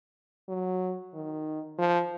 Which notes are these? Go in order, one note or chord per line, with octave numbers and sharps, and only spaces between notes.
F#3
D#3
F3